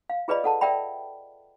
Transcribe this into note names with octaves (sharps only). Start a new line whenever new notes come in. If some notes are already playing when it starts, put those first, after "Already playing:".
F5
F4 G#4 B4 D5 D#5 B5
A4 F#5 A5
A#4 D5 E5 G5 B5